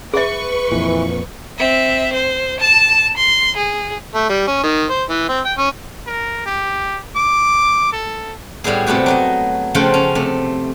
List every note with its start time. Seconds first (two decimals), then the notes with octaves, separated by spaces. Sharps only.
0.14 G#4 B4 E5 C#6
0.72 F2 A#2 E3
1.58 C4 E5
2.13 C5
2.60 A5 E7
3.17 C6
3.56 G#4
4.15 A3
4.29 G3
4.47 C#4
4.63 D#3
4.90 C5
5.09 E3
5.29 C4
5.45 G5
5.58 C#4
6.07 A#4
6.46 G4
7.16 D6
7.92 A4
8.64 A2 G3 B3 E4 G#4
8.87 C3 A3 B3 F#4 G4
9.06 F#3 A3 D#5
9.75 C#3 F3 A3 F4 F#5 G5
9.94 C#4
10.15 C3 A3